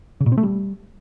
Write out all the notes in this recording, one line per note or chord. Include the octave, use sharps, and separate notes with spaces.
C#3
A#2
C4
A3
G3